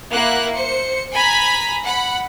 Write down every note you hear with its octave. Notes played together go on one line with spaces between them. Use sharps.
A#3 E4 F#5 F#6
C5 C#7
G#5 A#5 B5 B6
F#5 B5